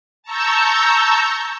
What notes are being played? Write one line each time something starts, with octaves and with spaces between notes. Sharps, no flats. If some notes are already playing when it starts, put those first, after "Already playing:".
A5 A#5 C#6 E6 G6